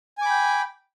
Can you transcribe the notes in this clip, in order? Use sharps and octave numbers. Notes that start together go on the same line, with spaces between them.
G5 G#5 B5 D6